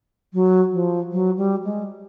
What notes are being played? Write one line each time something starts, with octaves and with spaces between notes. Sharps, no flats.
F#3
F3
F#3
G3
G#3